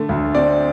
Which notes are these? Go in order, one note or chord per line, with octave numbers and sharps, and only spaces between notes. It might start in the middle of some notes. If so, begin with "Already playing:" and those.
Already playing: D3 A3
D2
C4 D5